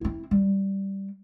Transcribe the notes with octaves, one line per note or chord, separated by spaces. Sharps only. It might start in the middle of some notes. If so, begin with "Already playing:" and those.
C4 E4
G3